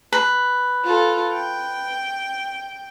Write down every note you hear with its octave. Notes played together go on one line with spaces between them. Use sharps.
B4
F4 A4
G5